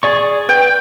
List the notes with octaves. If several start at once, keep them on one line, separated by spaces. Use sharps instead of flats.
G#4 D5 C#6
B4 G5